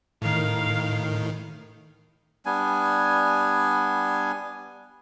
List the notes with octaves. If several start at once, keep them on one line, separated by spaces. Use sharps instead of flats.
A2 D#3 A#4 F5
G3 B3 D4 G#5